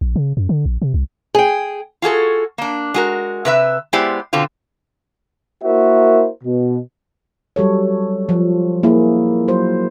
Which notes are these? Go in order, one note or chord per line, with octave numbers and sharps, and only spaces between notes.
A#1
C#3
F#2
D3
A#1
C3
C2
G#4 G5
F4 F#4 G#4 A4
A#3 D4
G#3 F#4 A#4
C3 B4 E5
G#3 B3 E4 G4 C5 D5
B2 D3 C4 F4
A#3 E4 F#4 A#4 C5 E5
B2
F#3 G3 A4 C#5
F3
A#3 E4 G#4
F#3 C5